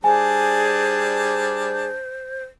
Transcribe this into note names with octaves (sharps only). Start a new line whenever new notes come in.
G3 D4 G#4 C5 G#5 A5